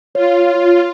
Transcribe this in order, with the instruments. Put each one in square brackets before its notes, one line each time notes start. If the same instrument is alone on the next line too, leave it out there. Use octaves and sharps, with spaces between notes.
[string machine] F4 [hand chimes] C#5